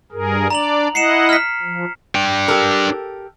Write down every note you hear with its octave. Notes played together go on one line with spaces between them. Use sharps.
G2 G#4 A#4
D4 D5 A#5 F7 F#7
E4 D#5 F#5 C7 C#7 E7
F6 B6
F3
D4 G5
G4 A4 A#4